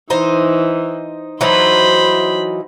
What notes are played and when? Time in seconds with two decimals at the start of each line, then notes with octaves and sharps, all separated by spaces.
0.10 E3 D#4 C5
1.41 E3 F#3 D#4 C5 B5